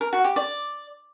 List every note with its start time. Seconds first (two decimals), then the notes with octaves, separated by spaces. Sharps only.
0.01 A#4
0.13 F#4
0.24 G4
0.36 D5